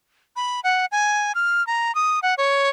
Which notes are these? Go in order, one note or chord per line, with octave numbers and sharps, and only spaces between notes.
B5
F#5
G#5
F6
A#5
D#6
F#5
C#5